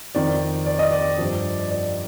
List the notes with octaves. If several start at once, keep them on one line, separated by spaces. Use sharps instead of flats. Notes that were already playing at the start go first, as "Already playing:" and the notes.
F2 D#3 D5
D5
D#5
D5
G2 F3
D5